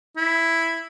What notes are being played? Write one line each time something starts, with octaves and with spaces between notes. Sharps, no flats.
E4